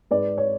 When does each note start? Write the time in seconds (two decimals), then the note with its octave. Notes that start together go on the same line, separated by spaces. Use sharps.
0.11 G#2 B4 D5
0.38 C#5